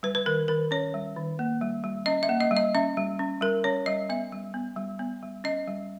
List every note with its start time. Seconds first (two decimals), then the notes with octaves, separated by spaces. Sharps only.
0.03 G3 B4
0.15 B4
0.26 D#3 A#4
0.48 D#3 A#4
0.71 C#4 C#5
0.94 G3
1.16 D#3
1.39 A#3
1.61 G3
1.84 G3
2.06 C#4 D#5
2.23 E5
2.29 A#3
2.40 D#5
2.51 G3
2.57 D#5
2.75 C#4 E5
2.97 G3
3.19 C#4
3.41 G3 A#4
3.64 C#4 C#5
3.86 G3 D#5
4.09 B3 E5
4.32 G3
4.54 B3
4.76 G3
4.99 B3
5.22 G3
5.44 C#4 D#5
5.68 G3